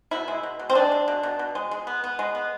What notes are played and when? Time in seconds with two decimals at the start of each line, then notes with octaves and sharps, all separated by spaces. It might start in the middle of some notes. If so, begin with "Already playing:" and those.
0.11 B2 E4
0.28 G#3
0.43 B2
0.59 B2
0.70 C4
0.75 G#3 D4
0.92 G#3
1.08 B2
1.23 B2
1.39 B2
1.55 G#3
1.71 G#3
1.87 B3
2.04 B3
2.19 G#3
2.35 B3